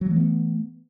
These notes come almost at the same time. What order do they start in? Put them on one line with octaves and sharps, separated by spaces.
F#3 E3 A3 B3